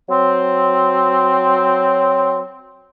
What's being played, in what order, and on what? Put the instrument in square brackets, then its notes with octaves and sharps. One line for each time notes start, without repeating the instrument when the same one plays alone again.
[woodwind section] F#3 C4